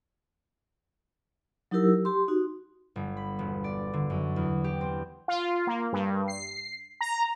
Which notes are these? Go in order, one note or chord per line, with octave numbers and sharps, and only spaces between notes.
F#3 D#4 E4 G4 A#4 E6
G4 C6
D#4 F#4
G1
B5
E1
D5
D3
F#2
E2
G4
C4
F4
A#3
G2
C7
A#5